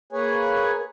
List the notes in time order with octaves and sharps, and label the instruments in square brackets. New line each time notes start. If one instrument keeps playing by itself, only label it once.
[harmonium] A#3 G#4 B4 C#5 G#5